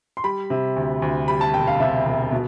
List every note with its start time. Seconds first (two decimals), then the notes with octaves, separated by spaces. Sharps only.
0.17 C6
0.24 G3 B5
0.50 C3
0.76 D2
1.02 D2
1.28 G3 B5
1.41 A5
1.54 E1 G5
1.67 F5
1.80 C3 E5
2.06 E1
2.32 B2